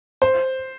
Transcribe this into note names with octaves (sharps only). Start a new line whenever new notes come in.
C5